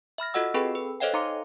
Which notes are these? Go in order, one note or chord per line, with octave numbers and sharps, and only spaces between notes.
E5 B5 F6 A#6
F4 F#4 A4 D#5 F#5 E6
C4 G#4 A4 B4 G5 B5
B4
A4 C5 C#5 D#5 F5 G5
D#4 F5 A#5 C6 D6 C#7